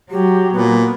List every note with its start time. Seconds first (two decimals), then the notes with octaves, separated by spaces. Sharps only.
0.11 F#3 G4
0.53 A#2 B3